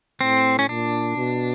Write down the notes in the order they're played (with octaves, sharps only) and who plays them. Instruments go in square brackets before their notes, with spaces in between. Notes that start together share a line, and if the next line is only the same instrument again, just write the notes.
[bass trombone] A2 [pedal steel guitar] C4
[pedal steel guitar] C#4
[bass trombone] A#2 [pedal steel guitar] D4
[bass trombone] B2